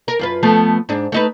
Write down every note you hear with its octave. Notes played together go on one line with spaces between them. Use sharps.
A#4
F#2 F4 B4
F3 A3 B3
G#2 D4
A3 D#4 B4